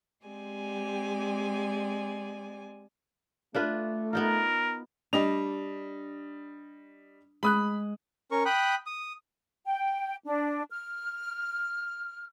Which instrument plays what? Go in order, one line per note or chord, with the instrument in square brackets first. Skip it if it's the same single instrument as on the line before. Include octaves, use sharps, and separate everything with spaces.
[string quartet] G#3 C4 G4 D5 G#5
[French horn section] A3 [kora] D4 F4 B4
[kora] B3 D#4 F4 [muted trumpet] A#4
[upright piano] G3 D#5 F7 [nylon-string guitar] D4
[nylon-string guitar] G#3 [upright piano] B5 D#6 F#6
[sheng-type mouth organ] C#4 A#4 C#6
G5 B5 D#6 F#6
D#6
[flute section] G5
D4
F6